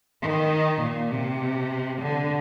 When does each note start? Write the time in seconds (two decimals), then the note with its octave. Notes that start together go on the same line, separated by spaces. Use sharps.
0.22 D#3
0.82 A#2
1.11 C3
2.01 D3